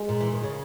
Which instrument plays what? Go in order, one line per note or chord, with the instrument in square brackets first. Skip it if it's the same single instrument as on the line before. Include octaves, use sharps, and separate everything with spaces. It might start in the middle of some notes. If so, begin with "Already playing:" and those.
Already playing: [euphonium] G#3
[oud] A#2
E3
D#3
C#3